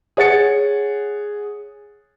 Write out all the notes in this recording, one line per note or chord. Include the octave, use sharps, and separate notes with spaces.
G#4 C#5 F#5 A6 C#7